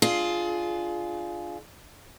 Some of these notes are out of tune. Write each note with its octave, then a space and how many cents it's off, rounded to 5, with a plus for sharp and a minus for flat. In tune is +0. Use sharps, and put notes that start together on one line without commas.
D4 +20 F4 +0 G#4 +20